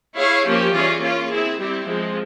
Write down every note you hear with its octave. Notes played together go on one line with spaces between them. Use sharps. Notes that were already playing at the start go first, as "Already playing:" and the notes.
E4 G#4 C#5 F5
F3 A#3 C#4 G4
E3 G3 C#4 F4 G#4
A#3 C#4 F4
C4 E4 G#4
G3 C4 E4 G4
F3 G#3 C4